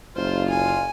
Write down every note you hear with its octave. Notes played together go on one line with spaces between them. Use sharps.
F#1 F4 C5
G#5